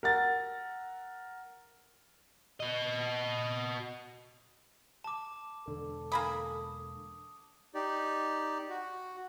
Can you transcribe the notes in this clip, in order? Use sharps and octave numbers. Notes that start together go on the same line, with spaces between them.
A#4 F#5 A6
F#4 D#5
A5 D6
E1 D3 A4
A#3 G#4 B5 D#6
D#4 G4 D5
F#4